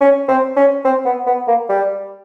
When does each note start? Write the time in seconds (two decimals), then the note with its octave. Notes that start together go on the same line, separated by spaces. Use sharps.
0.01 C#4
0.28 C4
0.56 C#4
0.84 C4
1.05 B3
1.26 B3
1.48 A#3
1.69 G3